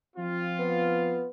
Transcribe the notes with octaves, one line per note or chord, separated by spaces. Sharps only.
F3 C4 F4
B3